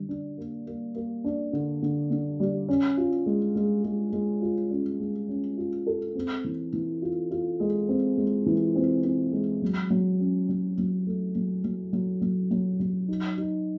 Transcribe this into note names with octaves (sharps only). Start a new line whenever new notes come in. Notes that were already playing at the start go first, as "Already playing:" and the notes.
Already playing: D3 G3
D4
A#3
A#3
A#3
D4
D3
D3
D3
G3
C#4
F4
G#3
G#3
G#3
G#3
F4
C#4
G#3
C#4
F4
A4
C4
E3
E3
F4
F4
G#3
C4
G#3
E3
C4
C4
G#3
F#3
F#3
C#4
F#3
F#3
A3
F#3
F#3
F#3
F#3
F#3
F#3
D#4
D#4